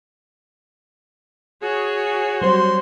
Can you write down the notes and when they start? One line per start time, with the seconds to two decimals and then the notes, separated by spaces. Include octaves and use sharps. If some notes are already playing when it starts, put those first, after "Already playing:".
1.62 F#4 G#4 C#5
2.42 F#3 G3 C5 C6